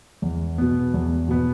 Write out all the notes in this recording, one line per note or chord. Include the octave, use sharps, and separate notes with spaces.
E2
B2 B3
E2
B2 B3